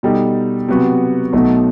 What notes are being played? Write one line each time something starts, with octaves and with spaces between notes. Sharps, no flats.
B2 G3 D#4 A4
C3 F#3 B3 F#4
B1 B2 F#3 A3 D#4